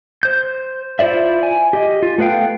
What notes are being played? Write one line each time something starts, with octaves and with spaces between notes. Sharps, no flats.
C5 G6
E4 F4 C5 D5 E5
G#5
G4 D#5
F4
A3 B3 B4 F5 G5